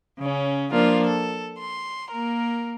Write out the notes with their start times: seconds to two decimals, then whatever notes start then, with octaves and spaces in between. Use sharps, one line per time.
0.18 C#3 C#4
0.71 F3 A#3 D4 F4
1.07 A4
1.59 C6
2.11 A#3 A#4